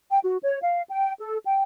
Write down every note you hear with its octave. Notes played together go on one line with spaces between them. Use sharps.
G5
F#4
C#5
F5
G5
A4
G5